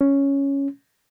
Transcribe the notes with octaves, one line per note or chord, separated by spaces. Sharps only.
C#4